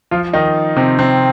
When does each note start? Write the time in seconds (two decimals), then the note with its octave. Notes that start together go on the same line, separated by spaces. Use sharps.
0.11 F3 F4
0.33 D#3 D#4
0.76 C3 C4
0.99 C3 C4